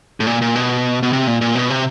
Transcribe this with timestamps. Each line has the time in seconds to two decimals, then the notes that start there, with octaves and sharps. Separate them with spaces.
0.20 A2
0.27 A#2
0.42 A#2
0.55 B2
1.03 B2
1.13 C3
1.27 A#2
1.41 A#2
1.55 B2
1.70 C3